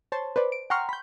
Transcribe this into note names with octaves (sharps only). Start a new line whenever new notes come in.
C5 C#5 A5 C6
B4 C5 D5
D7
F#5 G5 A#5 C6 C#6 F6
B5 G6